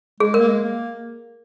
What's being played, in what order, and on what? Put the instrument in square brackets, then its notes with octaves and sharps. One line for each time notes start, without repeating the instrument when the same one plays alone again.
[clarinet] G#3 [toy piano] G#4
[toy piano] A#4
[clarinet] A#3
G#3
A#3